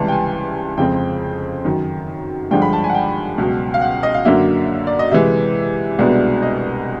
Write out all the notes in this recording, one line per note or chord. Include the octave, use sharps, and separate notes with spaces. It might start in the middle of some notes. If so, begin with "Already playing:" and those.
Already playing: C#2 C3 E3 G3 A5
G5
G#5
F2 C#3 F3 G#3 C4 G5
F#2 D#3 F#3
G2 D3 F3 G#3 G5
B5
A5
G#5
F#5
G5
C#2 B2 F#3
F5
F#5
D#5
F5
F#2 D3 F#3 A#3 E5
D5
D#5
C3 E3 G#3 E5
C2 B2 G#3 B3 D4
D#5